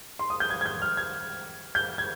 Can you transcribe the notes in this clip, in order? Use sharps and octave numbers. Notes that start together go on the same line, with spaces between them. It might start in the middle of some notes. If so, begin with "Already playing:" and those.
C6
D#6
G6
G#6
G#6
G6
F6
G#6
G6
G#6